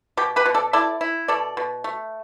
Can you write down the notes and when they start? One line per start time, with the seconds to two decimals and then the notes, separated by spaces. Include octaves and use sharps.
0.17 B2 G4
0.36 G4 B4
0.46 B2
0.55 A4 D5
0.73 E4 A4 D5
1.01 E4
1.28 B2 A4 D5
1.57 B2
1.84 A3